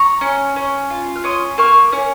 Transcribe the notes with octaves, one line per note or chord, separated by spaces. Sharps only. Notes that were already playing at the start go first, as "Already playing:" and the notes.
Already playing: A#5 C#6
C#4
C#4
F4
F6
C#4 C6 D#6
A#3 C#6 F6
C#4